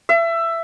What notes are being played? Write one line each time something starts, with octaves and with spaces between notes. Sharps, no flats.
E5